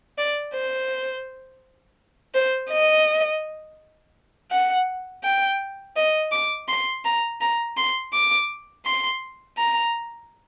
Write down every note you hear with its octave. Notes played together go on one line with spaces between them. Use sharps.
D5
C5
C5
D#5
F#5
G5
D#5
D6
C6
A#5
A#5
C6
D6
C6
A#5